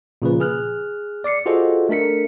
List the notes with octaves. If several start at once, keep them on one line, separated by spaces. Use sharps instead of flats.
A#2 C#3 F3 B4
G#4 F6 F#6
D5 D6 C7 C#7
F4 F#4 G#4 A4 C5 D#5
A3 D4 A#4 B6 C#7